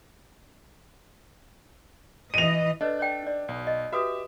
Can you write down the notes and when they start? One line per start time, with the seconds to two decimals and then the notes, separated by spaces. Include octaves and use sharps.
2.34 E3 D#5 D#7 F7
2.81 D4 A4 B4 C#5 D#5
2.99 C#5 D5 G5
3.23 D#4 D5
3.48 B1
3.67 D#5
3.93 F#4 G4 B4 E5 D#6